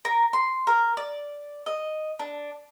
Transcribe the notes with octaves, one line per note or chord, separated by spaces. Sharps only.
A#4
C6
A#4
D5
D#5
D4